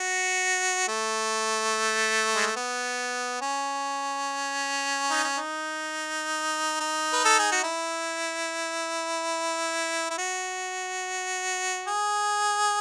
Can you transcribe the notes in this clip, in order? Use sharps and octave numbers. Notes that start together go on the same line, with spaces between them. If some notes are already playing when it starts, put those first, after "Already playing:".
Already playing: F#4
A3
G#3
A3
B3
C#4
D#4
C#4
D#4
D#4
B4
A4
G#4
F#4
E4
E4
F#4
G#4